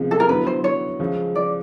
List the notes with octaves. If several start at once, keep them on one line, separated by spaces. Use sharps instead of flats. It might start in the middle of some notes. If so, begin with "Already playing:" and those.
Already playing: C#2 C3 F3 G#3 B3
A4
A#4
D3 F#3 B3 E4 B4
C5
C#5
C#2 C#3 F3 G#3
D5